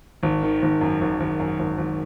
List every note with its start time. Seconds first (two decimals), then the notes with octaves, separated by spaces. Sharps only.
0.23 G#1
0.42 D#3
0.62 G#1
0.81 F#2
1.01 G#1
1.20 G#1
1.39 F#2
1.59 G#1
1.78 G#1